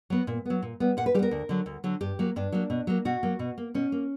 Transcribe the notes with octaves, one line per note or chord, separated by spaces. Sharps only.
F#3 B3
A#2
F#3 B3
A#2
G3 B3
A#2 F#5
B4
G3 B3 G4 A#4
D2
D3 F#3
D2
D3 F#3
G2 G4
F#3 A#3
G2 D4
F#3 A#3
B2
F#3 A#3
B2 F#4
F#3 A#3
B2
A#3
B2 C#4
A#3